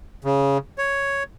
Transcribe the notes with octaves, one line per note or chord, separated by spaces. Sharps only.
C#3
C#5